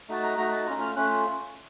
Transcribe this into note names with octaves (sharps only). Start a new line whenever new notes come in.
A3 D#4 F#4 A5
A#5
A3 D#4 F#4 A#5
A5
A3 C#4 F4 A#5
F6
A3 C#4 F4 F#6